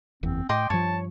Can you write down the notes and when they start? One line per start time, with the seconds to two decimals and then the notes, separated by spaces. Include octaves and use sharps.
0.23 F#1 E2 C4
0.49 A2 D#5 G5 C6 D6
0.70 G2 F3 C#5 A5